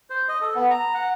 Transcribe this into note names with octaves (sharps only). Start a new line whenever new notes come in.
C5
D#5
A4
B3
A#5
F#5